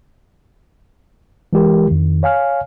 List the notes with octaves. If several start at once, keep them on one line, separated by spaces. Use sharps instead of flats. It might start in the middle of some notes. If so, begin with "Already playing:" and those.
E3 G#3 G4 A#4
F2 D#3
C#5 F5 G#5 F6